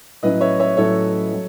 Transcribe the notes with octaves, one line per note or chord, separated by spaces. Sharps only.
A2 F#3 C#4 E4 B4 D#5
C#5 E5
C#5 E5
A2 F#3 C#4 E4 A4 C#5
F#3